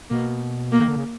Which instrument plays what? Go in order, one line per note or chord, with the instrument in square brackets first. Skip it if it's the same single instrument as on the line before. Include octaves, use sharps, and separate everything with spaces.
[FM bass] B2 [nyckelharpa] A#3
[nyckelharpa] A#3
[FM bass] D#3
D3
C#3